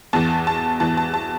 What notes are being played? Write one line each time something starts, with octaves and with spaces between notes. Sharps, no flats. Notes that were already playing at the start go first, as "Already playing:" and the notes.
E2 E3 A5
A5
E2 E3 A5
A5
A5